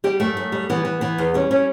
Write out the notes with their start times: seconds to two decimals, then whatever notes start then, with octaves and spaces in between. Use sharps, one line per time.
0.04 G3 G4
0.20 F#2 A3
0.37 F#2
0.52 G3
0.70 E3 B3
0.85 E3
1.01 E3 B3
1.18 E2
1.34 G3 C#4
1.51 G3 C#4